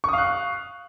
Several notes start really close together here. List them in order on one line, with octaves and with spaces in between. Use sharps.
C#6 D#6 F5 F#6